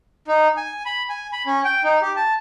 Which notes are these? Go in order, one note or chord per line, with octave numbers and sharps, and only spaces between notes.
D#4
G#5
B5
G#5
B5
C#4
G5
D#4
G4
A5